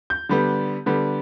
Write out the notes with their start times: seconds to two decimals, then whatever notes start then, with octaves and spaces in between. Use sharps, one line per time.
0.10 G6
0.29 D3 G3 B3
0.86 D3 G3 B3